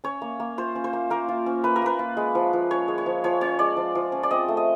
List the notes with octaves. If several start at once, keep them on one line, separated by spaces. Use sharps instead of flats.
C#4 C#5
A#3
A#3
F4 C5
C#4
C5
A#3
A#3 A#4
F4
C#4
A#3 B4
A#4
A#3 B4
F4
G#3
F3
F3
C#4 C#5
G#3
C#5
F3
F3 C#5
C#4 C#5
G#3 D5
F3
F3
C#4
D5
C4 D#5
A3
D#5